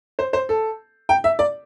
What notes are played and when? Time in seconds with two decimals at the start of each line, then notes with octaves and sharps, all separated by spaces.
0.19 C5
0.33 C5
0.49 A4
1.09 G5
1.24 E5
1.39 D5